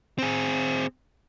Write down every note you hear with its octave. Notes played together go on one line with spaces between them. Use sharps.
C4 G#4